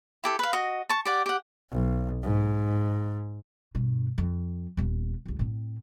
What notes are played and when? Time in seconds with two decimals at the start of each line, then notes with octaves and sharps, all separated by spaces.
0.24 E4 G4 A4
0.39 B4 F5
0.53 F#4 D#5
0.89 A5 C#6
1.05 G4 D5 F#5
1.26 G4 F#5
1.71 B1
2.23 G#2
3.75 G2 B2
4.18 F2
4.77 D#1 B3
5.25 G1 C#2
5.39 A2 C4